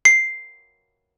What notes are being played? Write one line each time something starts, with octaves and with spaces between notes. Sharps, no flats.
C7